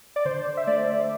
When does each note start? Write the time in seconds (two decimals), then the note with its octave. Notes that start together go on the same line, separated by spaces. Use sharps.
0.16 D5
0.25 D3 C5
0.57 E5
0.67 A3 D5